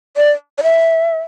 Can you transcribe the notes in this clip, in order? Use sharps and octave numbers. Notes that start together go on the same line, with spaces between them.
D5
D5
E5